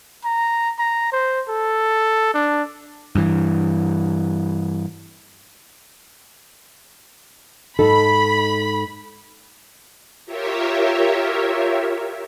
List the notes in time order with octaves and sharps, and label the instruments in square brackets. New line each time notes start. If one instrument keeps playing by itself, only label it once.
[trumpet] A#5
A#5
C5
A4
D4
[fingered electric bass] G2 E3
[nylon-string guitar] G#2 D#4 A4 [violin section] B5
[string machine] F4 G4 A#4 C#5 E5